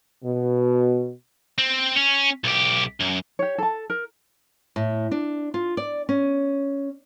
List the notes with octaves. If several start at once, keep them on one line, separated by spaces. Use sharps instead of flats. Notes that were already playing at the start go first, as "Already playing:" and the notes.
B2
C4
C#4
B1 G4
F#2
G4 C#5
A4 A5
A#4
A2
D4
F4
D5
C#4